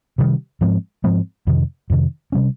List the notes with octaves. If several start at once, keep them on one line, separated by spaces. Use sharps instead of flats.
C3 D#3 G3
G#2 F3 G#3 C4
G#2 F3 G#3 C4
F2 C3 D#3
F2 C3 D#3
C3 G3 C#4